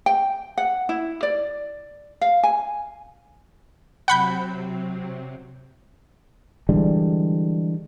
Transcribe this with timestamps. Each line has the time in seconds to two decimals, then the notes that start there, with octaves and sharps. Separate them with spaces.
0.06 G5
0.58 F#5
0.89 E4
1.23 D5
2.21 F5
2.43 G#5
4.08 C3 F#3 C4 F#5 B5 G6
6.69 D3 E3 G3 G#3